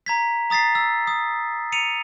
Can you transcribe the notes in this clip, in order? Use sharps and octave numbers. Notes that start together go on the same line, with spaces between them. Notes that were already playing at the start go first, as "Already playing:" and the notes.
A#5 G#6 B6
A#5 D#6 A6 B6 C7
E6
D#6
C#7 D#7 F7